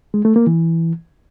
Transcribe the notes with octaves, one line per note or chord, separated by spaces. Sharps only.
G#3
A3
A#3
E3